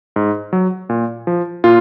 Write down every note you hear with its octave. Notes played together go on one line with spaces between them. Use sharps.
G#2
F#3
A#2
F3
A#2 F4